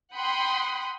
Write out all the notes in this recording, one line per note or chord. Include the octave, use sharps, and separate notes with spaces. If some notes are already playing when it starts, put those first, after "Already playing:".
F#5 G5 B5 C6 D#6